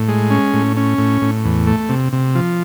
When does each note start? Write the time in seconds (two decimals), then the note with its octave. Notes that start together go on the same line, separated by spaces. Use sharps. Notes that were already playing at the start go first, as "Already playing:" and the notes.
Already playing: A2
0.08 G#3
0.30 C#4
0.53 A2
0.77 C#4
0.98 A2
1.22 A2
1.45 E2
1.67 A3
1.89 C3
2.13 C3
2.35 F3